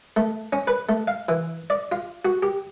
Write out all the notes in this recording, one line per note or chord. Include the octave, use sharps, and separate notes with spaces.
A3
C#4
B4
A3
F5
E3
D5
F4
F#4
G4